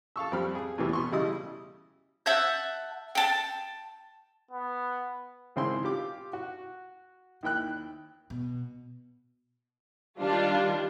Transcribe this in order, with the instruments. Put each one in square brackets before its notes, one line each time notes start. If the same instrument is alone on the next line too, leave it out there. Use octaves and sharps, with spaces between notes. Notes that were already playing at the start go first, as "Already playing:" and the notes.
[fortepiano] A4 F5 C#6 E6
F2 G3 C4 F5 B5 F6
G#4
E2 C3 E3 A3 B3
B2 C6 C#6
C#3 G3 E4 D#5 D#6
[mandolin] E5 F#5 A5 G6
G5 A5
[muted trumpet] B3
[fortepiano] G#1 C#3 C4 E4 G#5 C6
F4 G4 D6
F#4
D#2 E4 G5 F#6
[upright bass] B2
[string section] D#3 G3 D4 F4